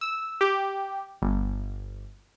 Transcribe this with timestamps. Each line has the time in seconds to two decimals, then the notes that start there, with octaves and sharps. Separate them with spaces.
0.01 E6
0.41 G4
1.22 G1